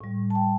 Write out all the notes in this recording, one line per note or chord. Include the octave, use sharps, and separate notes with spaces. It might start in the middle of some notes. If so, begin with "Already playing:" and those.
A2 G3
A5
G5